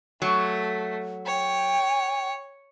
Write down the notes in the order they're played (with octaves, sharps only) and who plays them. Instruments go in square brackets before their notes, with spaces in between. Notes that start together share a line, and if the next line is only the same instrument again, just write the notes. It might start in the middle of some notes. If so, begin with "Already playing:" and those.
[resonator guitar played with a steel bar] F#3 [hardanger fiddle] A3
[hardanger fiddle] C#5 [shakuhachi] G5